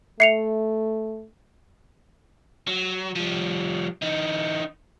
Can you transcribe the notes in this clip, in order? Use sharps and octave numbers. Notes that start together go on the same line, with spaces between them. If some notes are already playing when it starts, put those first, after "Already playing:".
A3 E5 C7 C#7 F7
F#3
F3 G3
E3 D#4